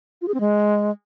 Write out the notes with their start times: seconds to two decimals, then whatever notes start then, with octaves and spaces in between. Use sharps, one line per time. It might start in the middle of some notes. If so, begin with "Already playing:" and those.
0.22 F4
0.28 G#4
0.34 C4
0.40 G#3